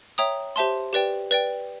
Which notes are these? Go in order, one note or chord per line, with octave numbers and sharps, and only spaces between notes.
C#5 E5 G5 A#5 D#6
G4 C5 E5 A5 C6
G4 B4 D5 G5
B4 D5 G5